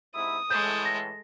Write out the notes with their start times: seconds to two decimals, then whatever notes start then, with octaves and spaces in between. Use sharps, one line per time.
0.15 G#2 C3 E4 D#6
0.51 A2 E3 G#3 A4 G6
0.85 A#6